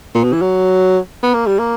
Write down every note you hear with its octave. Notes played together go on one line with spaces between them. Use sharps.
A#2
B2
E3
F#3
B3
A#3
G3
A#3